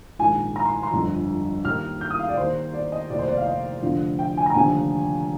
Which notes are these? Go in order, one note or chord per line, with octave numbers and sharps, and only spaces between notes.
A#1 G#2 D#3 G#5
A#5
C6
C6
G1 F2 D3
D#2 D#3 F6
G6
D#6
F5
D5
D#2 D#3 C5
D5
D#5
F1 D#2 D#3 D5
C5
D5
F5
D#5
F1 F2 D3 F3
G5
G#5
A#5
F1 D#2 D3 F3 G#5